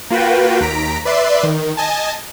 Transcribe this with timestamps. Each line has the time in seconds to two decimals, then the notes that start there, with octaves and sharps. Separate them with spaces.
0.10 A#3 F4 F#4 B4 G5
0.61 D#2 A#5 B6 D7
1.05 B4 D5 E5 C6
1.43 D#3
1.77 D#5 G#5 A5